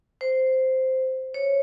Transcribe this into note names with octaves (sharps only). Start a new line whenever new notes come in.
C5
C#5